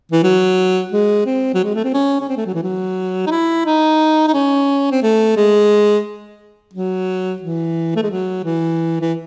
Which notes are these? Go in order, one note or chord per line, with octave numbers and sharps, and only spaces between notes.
E3
F#3
G#3
C4
F#3
G#3
A3
C4
C#4
C#4
C4
A3
F#3
E3
F#3
D#4
E4
D#4
D#4
C#4
C4
A3
G#3
F#3
E3
A3
G#3
F#3
E3
E3